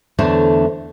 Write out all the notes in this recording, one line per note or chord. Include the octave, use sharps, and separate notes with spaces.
E2 D3 A3 D4 C5 C#5